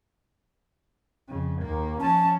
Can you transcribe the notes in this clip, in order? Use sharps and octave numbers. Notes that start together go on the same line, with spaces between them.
F2 C#3
D#2 A#3
F3 C#4 A5